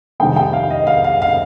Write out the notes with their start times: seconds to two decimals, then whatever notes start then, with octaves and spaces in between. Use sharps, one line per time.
0.20 F1 F2 D#3 G3 G5
0.36 G5
0.53 F5
0.70 D#5
0.87 F5
1.04 F5
1.22 F5